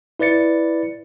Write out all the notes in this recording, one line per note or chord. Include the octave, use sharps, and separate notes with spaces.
E4 B4 D5 A6 C#7